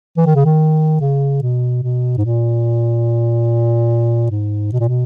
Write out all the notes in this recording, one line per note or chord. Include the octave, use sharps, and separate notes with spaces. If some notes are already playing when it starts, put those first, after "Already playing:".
E3
D#3
C#3
D#3
C#3
B2
B2
G#2
A#2
G#2
B2
A#2
B2